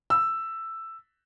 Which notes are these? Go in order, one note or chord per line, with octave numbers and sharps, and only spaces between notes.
E6